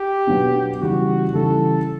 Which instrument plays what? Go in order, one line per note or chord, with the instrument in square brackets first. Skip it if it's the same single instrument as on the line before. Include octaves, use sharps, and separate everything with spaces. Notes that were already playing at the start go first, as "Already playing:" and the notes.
Already playing: [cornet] G4
[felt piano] B2 F#3 B3 D4
[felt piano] C#3 E3 G3 [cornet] F#4
[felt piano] C#3 E3 G3 [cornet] A4